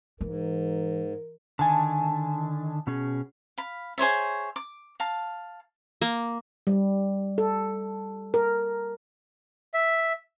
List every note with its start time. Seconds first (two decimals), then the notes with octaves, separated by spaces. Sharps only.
0.21 G#2 E3 A#4
1.59 D3 D#3 G#5 A5
2.87 B2 C#4 G#4
3.58 F5 B5
3.98 G#4 C5 C#5 E5
4.56 D6
5.00 F5 A5
6.02 A#3
6.67 G3
7.38 A4
8.34 A#4
9.74 E5